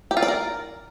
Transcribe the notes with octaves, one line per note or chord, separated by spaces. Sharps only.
G4
F4
D5
A#4